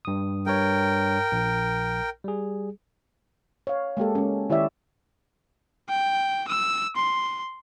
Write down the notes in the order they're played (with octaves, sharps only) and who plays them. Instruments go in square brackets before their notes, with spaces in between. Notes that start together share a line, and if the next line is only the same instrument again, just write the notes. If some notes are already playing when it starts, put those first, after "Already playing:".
[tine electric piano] G2 D#6
[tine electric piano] G2 C#5 [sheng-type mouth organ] A#4 G5
[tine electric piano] A#1
G3 G#4
[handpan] C#5 F5
G#3 A#3 G4 A4
G#3 C#4
D#3 E4 G4 C#5 D5 E5
[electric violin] G5
E6
C6